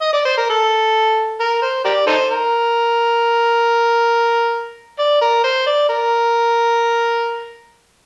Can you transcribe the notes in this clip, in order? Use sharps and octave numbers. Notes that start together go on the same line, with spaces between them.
D#5
D5
C5
A#4
A4
A#4
C5
G4 A#4 D5
D#4 A4 C5
A#4
D5
A#4
C5
D5
A#4